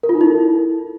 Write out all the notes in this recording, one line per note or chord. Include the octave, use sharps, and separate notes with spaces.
A#4
F4
D#4
E4
A4